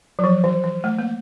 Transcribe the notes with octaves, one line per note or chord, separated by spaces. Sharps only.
F#3
F3
E3
E3
A3
A#3